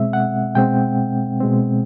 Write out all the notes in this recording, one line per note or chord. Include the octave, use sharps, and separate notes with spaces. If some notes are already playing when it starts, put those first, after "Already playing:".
Already playing: B2 G#3 C4 E5
F#5
B2 G#3 C4 G5
B2 G#3 C4